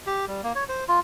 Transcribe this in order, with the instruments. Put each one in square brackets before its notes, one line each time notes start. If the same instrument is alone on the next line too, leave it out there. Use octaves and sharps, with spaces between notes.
[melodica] G4
G3
A#3
C#5
C5
F4